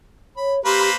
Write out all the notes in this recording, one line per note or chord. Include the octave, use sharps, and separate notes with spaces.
C#5 B5
A#3 G4 B4 C5